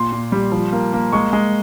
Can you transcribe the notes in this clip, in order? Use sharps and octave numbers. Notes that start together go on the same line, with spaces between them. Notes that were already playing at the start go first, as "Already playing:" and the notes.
Already playing: A#2 C6
A#2
G3
F3
A#3
A#3
G#3 C#6
G#3